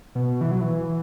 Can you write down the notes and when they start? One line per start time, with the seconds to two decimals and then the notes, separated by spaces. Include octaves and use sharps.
0.15 B2
0.41 E3
0.51 F#3
0.61 E3